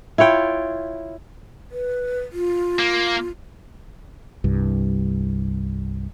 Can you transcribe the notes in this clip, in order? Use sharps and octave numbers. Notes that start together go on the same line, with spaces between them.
E4 F4 C#5 G5
B4
F4
A#3
C2 G2